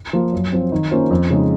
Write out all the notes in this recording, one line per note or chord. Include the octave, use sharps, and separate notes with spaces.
F3 A#3 F4
F#2
F3 C4
D#3
A#3 C#4 F4 C5
F2
C#3 G#3 D#4